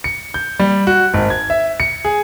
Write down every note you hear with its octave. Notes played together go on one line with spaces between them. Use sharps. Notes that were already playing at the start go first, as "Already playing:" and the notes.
C#7
G6
G3
F#4
G#1
G#6
E5
C#7
G#4